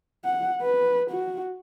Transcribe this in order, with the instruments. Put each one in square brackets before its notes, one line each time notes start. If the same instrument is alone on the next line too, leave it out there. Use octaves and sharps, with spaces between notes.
[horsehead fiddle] F#5
B4
F#4